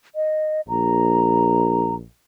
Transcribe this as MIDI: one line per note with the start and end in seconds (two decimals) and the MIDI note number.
0.16 0.61 75
0.69 2.06 34
0.69 1.94 82